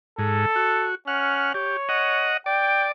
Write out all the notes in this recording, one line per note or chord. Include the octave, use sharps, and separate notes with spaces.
G#2 A4
F#4
C#4 F#5 F6
G4 C#5
D#5 F#5
D5 G5